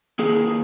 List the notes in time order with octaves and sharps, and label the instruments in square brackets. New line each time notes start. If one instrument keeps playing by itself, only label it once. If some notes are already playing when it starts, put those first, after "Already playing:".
[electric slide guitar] D#3 A#3 G#4